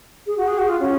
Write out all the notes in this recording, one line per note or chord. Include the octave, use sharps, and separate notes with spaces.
G#4
F#4
G#4
F#4
F4
C#4